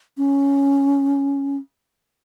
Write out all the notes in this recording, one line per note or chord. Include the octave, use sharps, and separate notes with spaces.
C#4